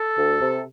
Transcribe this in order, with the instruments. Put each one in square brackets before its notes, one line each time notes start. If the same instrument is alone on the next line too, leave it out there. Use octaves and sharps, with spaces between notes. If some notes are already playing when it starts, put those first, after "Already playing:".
Already playing: [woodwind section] A4
D2
C3